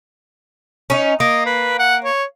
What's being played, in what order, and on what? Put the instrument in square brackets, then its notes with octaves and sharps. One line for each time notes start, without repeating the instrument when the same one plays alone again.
[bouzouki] C#4 D#4
[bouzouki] A#3 [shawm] D#5
[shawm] B4
F#5
C#5